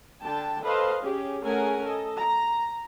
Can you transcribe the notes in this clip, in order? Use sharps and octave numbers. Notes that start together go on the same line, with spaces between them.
D3 G5 A5
A4 B4 C5 D#5 F5
C#4 G4 G#4
A3 C#4 G#4 A#4 F#5 G#5
A4 D#5
A#5